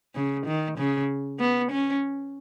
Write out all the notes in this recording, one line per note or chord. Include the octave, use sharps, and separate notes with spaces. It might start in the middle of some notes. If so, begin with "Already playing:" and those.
C#3
D#3
C#3
B3
C#4